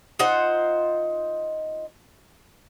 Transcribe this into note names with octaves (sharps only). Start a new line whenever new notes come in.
D#4 F4 C5 F#5